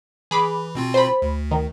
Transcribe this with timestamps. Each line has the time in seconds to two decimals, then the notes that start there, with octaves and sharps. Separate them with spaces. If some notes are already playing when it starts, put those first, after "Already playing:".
0.31 E3 G#4 B5 D6
0.75 B2 C4 F4
0.94 C5 B5
1.22 D2
1.51 D#3